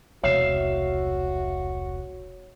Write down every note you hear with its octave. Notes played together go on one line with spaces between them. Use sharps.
E1 C2 F#4 C#5 E5 F5